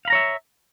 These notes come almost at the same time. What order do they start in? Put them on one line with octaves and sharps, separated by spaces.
F5 B5 A#5 C#5 E5